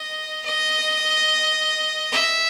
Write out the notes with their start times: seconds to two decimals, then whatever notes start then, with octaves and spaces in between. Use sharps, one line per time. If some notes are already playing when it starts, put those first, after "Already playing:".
Already playing: D#5
0.45 D#5
2.12 E5